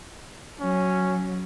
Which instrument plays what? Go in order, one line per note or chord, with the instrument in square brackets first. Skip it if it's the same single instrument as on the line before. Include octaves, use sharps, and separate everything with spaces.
[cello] F#3 [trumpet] C#4